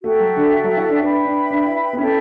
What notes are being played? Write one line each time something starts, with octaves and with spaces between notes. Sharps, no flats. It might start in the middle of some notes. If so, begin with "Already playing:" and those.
A3 F#4 A4 E5 G5
F#3
D3
F#3
E4
D4
D4 B4 E5 G5 B5
D4
D4
E4
B3
C#4 E4 A4 E5 G5